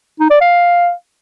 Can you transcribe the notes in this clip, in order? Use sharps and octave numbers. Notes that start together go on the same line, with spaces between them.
D#4
D5
F5